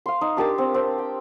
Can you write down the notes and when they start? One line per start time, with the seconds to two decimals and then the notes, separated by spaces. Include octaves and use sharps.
0.06 F5 C6
0.21 D#4
0.37 D4 G4 A#4 A5
0.58 C4
0.74 C4
0.98 G5